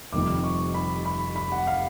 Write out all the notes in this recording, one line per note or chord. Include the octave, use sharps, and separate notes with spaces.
F1 F2 C3 D#3 G3 D6
C#6
B5
B5
B5
F#5
F5